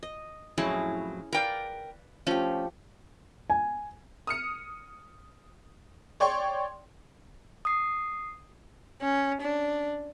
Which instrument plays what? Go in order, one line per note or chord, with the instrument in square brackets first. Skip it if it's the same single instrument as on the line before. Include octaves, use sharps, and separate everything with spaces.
[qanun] D#5
[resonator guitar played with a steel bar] F2 A2 F#3 [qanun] C#4 E4 G#4
[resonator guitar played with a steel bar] A#4 G5 [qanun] B4 D5 F5
[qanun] F3 G4 [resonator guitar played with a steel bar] A3 C#4
[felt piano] G#5
[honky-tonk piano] D#6 F6 C#7
C#5 D5 G5 C6 C#6
[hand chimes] D#6 C7
[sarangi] C#4
D4